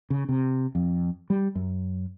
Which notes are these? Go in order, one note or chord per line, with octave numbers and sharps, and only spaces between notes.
C#3
C3
F2
G3
F#2